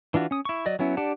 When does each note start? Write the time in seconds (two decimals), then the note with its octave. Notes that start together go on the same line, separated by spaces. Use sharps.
0.14 E3 D4 F4 F#4
0.31 C#4 D#6
0.45 E4 C#6
0.66 F#3 D5 D#5
0.79 F#3 B3 C#4 E4
0.97 D4 G4 D5 F#5 A5